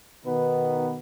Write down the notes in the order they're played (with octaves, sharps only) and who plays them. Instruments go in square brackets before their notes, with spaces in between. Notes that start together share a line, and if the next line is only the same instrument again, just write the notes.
[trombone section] B2 D#3 B3 D#4 B4